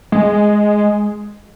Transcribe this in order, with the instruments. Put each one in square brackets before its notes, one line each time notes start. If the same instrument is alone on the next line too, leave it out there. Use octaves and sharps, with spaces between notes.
[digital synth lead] G#3